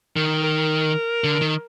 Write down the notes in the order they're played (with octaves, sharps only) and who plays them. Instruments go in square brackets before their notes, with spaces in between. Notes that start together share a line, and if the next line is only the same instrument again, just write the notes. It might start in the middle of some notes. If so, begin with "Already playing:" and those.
[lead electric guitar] D#3 [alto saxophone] A#4
[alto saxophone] A#4
[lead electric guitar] D3
D#3